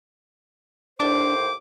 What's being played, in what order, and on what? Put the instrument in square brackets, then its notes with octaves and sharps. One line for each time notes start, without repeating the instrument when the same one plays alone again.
[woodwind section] D#2 A2 C5 [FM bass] D4 [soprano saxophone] D6